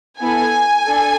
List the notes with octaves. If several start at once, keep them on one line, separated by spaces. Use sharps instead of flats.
B3 E4 A4 G#5
D4 A4